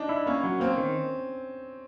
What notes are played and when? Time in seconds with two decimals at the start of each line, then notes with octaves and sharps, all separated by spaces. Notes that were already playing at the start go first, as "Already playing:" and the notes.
Already playing: D4 D#4
0.09 E4
0.26 A#3 C#4
0.43 F#3
0.60 A#3 C4
0.77 D#3